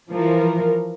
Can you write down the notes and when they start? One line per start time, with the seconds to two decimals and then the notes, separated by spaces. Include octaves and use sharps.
0.13 E3 F3 A#4